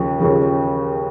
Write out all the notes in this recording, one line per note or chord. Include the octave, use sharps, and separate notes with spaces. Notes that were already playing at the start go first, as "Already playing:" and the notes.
Already playing: D#2 C#3 F3
D#2 C#3 F3